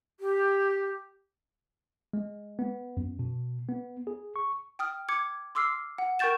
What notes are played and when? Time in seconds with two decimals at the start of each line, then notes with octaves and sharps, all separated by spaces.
0.20 G4
2.13 G#3
2.59 B3
2.97 F#2
3.19 B2
3.69 B3
4.07 G#4
4.36 C#6
4.79 G5 D#6 F6
5.09 D6 G#6 C#7
5.55 C6 D6 E6 F6 C7
5.98 F#5
6.19 A#4 G5 C#6 G6 A6 E7